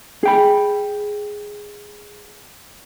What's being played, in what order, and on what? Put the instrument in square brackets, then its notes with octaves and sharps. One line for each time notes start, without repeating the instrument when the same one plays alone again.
[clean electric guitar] G#4 G5 B5